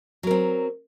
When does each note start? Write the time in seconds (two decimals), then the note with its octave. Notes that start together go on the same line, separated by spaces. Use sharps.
0.23 F#3
0.27 A#4
0.31 C4